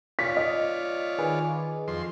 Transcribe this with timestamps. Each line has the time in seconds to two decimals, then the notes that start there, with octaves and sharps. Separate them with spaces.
0.19 F4 C#5 D5 B6
0.37 D#5
1.19 D#3 G#4 B4
1.88 F2 C6